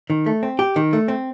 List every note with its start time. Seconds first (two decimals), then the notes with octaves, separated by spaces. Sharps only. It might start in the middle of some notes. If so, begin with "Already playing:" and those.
0.10 D#3
0.26 A3
0.43 C4
0.59 G4
0.76 D#3
0.93 A3
1.08 C4